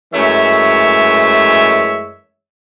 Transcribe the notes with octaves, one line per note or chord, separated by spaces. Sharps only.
F#2 E3 G#3 A3 C#5 E5